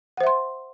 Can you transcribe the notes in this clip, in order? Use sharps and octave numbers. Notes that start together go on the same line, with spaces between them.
C5 E5 F#5 C6